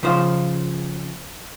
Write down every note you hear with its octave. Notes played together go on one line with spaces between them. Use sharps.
C#3 F3 F4 C5 C#5 F5